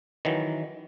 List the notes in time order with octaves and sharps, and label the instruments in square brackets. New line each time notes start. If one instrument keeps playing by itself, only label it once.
[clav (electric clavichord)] D#3 E3 F#3